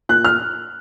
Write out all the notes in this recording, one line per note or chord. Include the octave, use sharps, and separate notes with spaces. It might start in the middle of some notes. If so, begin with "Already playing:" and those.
A#2 F#6
F6